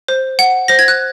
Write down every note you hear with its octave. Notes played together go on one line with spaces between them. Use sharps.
C5
F#5
C5 A#6
G#6
F#6